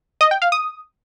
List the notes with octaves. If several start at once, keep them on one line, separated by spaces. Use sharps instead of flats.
D#5
G5
F5
D#6